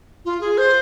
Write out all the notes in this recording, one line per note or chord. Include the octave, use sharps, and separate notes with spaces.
F4
G#4
C5